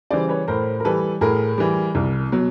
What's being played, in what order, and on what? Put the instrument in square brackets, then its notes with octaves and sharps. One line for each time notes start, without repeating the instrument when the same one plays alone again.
[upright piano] C#3 E3 G3 C5 D5
B4 C#5
A2 A#4 C5
A#4
E3 G3 A4 B4
A2 G#4 A#4
E3 G3
C2
B2 F#3